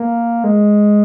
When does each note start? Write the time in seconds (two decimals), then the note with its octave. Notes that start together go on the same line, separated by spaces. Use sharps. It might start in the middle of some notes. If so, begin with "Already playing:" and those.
Already playing: A#3
0.44 G#3